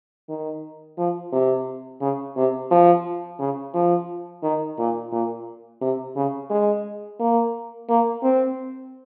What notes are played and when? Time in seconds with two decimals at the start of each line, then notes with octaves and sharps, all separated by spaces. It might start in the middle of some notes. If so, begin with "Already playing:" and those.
0.29 D#3
0.98 F3
1.32 C3
2.01 C#3
2.37 C3
2.71 F3
3.39 C#3
3.74 F3
4.43 D#3
4.78 A#2
5.12 A#2
5.81 C3
6.16 C#3
6.50 G#3
7.20 A#3
7.89 A#3
8.23 C4